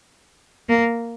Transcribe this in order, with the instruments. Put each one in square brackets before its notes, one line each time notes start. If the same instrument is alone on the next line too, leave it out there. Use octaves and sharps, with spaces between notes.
[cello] A#3